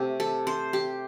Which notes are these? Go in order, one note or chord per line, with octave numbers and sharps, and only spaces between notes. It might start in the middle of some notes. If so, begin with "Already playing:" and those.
Already playing: C3 A3 G4
A4
C5
G4